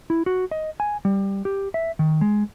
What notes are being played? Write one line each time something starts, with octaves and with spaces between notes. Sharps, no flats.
E4
F#4
D#5
G#5
G3
G4
E5
D#3
G#3